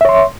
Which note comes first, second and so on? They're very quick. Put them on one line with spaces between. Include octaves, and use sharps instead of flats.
E5 C#5 C6